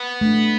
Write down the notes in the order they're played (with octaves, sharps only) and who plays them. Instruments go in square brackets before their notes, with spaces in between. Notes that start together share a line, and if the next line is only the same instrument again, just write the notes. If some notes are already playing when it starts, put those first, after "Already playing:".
Already playing: [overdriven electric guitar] B3
[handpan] A3 D4